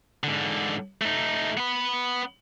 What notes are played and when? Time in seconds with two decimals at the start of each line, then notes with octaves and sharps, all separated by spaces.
0.24 G#2 D3
1.02 A3 D#4
1.57 B3 B5